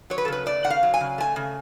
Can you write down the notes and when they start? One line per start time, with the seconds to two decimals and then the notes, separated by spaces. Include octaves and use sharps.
0.10 F#3 C#5
0.18 B4
0.25 A4
0.28 C#3 B4
0.46 A3 D5
0.64 C#3 F#5
0.70 F5
0.83 F#3
0.94 G#5
1.01 C#3
1.18 A3 G#5
1.36 C#3